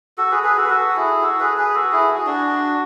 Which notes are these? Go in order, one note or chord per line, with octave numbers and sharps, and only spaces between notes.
F#4 A4
G#4 B4
G#4 B4
F#4 A4
B4
F#4 A4
E4 G#4
F#4 A4
G#4 B4
G#4 B4
F#4 A4
E4 G#4
F#4
G#4
D4 F#4